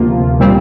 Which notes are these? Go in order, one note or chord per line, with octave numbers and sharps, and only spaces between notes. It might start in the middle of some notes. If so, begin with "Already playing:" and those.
Already playing: D2 C3 F3 A#3 F4
A#2 G3 C4